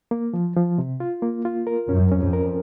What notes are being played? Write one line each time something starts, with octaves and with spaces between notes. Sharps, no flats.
A#3
F3
F3
C3
F4
A#3
F4
A#4
F#2 C#4
C#4
F2
A#4